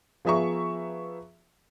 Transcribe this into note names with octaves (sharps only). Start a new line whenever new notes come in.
F3 B3 G#4 E5 A#5 C#6